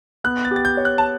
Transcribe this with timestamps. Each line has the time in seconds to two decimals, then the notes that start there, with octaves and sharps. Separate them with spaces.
0.24 B3 F#6
0.45 A6
0.51 G4
0.56 A6
0.65 G6
0.77 C#5
0.85 F#6
0.98 A5